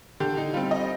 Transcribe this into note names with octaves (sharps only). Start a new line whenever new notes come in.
D3 G4
D#4
G3 C4 F4
D#5